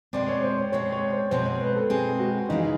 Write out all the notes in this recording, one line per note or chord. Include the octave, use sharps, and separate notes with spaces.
B2 G#3 C4 D5
C#5
C5
C#5
B2 G#3 C4 C#5
C#5
C5
B2 G#3 C4 C5
C5
B4
A4
B2 G#3 C4 G#4
F#4
C#3 E3 G#3 D#4